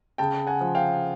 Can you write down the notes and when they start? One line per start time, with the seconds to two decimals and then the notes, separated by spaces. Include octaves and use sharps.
0.18 C#3 G5 A5
0.47 F#5 G#5
0.61 F3
0.75 F5 G5